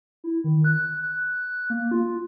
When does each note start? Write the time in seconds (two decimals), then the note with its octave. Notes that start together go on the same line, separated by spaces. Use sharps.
0.24 E4
0.44 D#3
0.64 F#6
1.02 F#6
1.70 A#3
1.91 F4